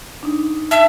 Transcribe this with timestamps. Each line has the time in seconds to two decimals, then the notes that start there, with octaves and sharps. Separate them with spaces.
0.23 D4 D#4
0.71 E5 A5